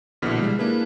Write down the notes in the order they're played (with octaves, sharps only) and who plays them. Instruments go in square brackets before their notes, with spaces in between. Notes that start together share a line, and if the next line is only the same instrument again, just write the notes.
[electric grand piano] A#1 B2 D3 E4 F6 B6
G3 G#3
A#3 D4 E4 G#4 B4